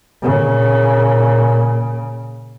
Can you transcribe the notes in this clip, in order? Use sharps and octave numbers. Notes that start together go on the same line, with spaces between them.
A#2 C#3